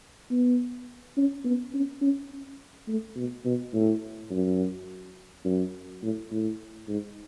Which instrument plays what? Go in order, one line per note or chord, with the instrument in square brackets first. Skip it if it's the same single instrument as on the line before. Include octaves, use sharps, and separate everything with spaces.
[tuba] B3
C#4
B3
C#4
C#4
A3
B2
B2
A2
F#2
F#2
A2
A2
G#2